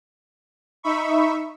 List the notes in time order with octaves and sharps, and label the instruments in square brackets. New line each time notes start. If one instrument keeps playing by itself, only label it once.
[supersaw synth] D#4 E5 B5 C#6